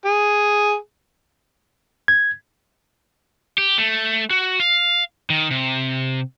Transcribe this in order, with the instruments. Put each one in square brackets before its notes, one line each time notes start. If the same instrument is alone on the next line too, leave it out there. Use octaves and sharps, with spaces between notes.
[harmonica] G#4
[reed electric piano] G#6
[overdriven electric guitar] G4
A3
F#4
F5
D#3
C3